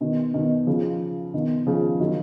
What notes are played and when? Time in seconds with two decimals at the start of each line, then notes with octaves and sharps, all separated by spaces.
0.01 B2 D#3
0.34 B2 D#3
0.67 C#3 F3
1.34 B2 D#3
1.67 C#3 F3
2.00 D#3 F#3